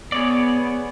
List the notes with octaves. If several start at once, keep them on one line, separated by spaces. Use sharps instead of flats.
B3 G#4 C#5 D5